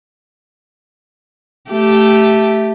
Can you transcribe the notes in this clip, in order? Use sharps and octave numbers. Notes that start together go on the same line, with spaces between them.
A3 G4